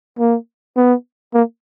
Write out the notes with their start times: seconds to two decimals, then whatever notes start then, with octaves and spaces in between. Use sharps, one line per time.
0.19 A#3
0.76 B3
1.34 A#3